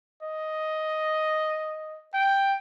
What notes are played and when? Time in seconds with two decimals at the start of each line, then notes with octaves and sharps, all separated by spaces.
0.23 D#5
2.14 G5